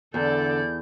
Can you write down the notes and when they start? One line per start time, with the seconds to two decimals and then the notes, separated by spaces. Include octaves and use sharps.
0.14 E2 D3 A4 D5 G6